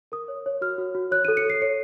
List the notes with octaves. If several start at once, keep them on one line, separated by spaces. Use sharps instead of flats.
A#4 D#6
C#5
C#5
F#4 F6
F#4
F#4
C#5 F#6
D#7
A4
C#7
A4 C7
C#5 C#7